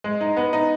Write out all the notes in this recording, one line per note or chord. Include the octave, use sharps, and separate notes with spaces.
G#3
D#4
B3
D#4